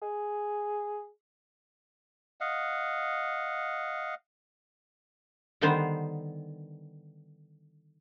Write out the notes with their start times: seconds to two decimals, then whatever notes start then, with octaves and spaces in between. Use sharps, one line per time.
0.02 G#4
2.41 D#5 F5 F#5
5.61 D3 D#3 G3 B3 D#4 C5